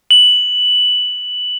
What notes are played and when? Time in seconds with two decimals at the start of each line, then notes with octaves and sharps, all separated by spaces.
0.11 F#7